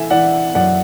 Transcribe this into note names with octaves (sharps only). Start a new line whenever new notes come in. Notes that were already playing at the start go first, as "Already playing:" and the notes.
Already playing: E3 A4 E5 G#5
E3 D5 F#5
F#2 D5 F#5